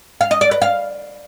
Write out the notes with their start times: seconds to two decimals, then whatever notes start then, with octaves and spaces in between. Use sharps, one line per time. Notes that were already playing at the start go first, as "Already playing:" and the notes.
0.21 F5
0.31 D#5
0.41 D5
0.51 B4
0.62 F5